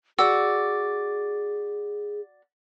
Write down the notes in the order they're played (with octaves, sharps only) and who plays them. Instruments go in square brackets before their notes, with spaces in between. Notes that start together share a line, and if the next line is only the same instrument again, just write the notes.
[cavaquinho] F#4 D5 [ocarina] G#4 [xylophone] E6